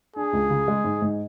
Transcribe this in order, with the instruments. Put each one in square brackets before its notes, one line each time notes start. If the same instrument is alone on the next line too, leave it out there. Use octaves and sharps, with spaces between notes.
[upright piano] D4 [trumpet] G#4
[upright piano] C#2
C#3
G#3
G#2
G#2